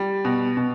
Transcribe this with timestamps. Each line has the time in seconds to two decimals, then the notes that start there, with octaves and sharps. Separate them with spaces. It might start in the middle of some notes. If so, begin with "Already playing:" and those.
Already playing: G3
0.25 B2
0.57 B2